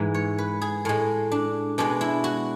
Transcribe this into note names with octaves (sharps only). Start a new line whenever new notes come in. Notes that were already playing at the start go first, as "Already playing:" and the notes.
Already playing: G#2 E3 G#3
C#5
B4
G#4
A2 G#3
D4
B2 G#3 D4
E4
F#4